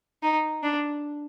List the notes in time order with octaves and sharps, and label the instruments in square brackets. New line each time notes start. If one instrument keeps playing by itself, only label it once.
[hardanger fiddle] D#4
D4